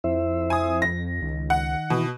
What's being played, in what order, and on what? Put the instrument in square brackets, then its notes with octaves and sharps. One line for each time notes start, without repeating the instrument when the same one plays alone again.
[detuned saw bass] F2 [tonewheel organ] E4 C5 E5
[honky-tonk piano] G#5 D#6
A#6
[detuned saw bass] C#2 [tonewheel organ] D#3
[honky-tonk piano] F#5
[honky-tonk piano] B2 [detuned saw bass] E3